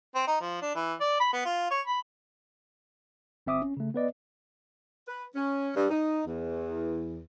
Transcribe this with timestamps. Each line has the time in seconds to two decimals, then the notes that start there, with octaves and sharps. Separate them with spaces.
0.15 C4
0.27 D#4
0.41 F3
0.62 D4
0.75 E3
1.01 D5
1.20 B5
1.33 B3
1.45 F4
1.71 C#5
1.87 B5
3.47 G1 C4 E5 D6 D#6
3.62 C#4
3.77 C#3 A3
3.94 B3 B4 D5 D#5
5.08 B4
5.35 C#4
5.76 G2
5.90 D#4
6.27 E2